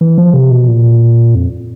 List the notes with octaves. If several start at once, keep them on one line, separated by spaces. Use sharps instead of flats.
E3
F3
C3
B2
A#2
F2